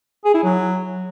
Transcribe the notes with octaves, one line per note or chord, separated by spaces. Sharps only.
G#4
E4
F#3